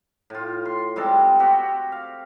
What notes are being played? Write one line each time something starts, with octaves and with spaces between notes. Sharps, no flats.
A2 F4
C6
G3 G#3 C4 A4
C4 F#4 G4
F5